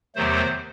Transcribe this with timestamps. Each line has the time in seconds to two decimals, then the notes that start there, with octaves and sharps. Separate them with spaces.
0.15 E2 C3 D#3 F#3 A3 C5